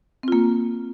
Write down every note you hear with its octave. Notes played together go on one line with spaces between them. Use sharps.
A#3 C4 F4